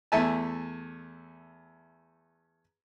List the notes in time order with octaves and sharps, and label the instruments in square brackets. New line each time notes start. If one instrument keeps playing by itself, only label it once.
[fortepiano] E2 A3 E5 G#5 A5